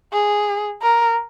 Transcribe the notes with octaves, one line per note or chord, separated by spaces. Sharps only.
G#4
A#4